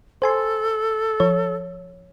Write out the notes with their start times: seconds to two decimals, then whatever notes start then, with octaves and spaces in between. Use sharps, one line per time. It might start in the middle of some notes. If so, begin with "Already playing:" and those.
0.22 A4 C5 G#5 C6
1.20 F3 C#5